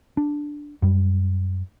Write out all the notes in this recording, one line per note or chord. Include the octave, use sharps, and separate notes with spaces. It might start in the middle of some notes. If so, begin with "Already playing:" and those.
D4
F#2 G3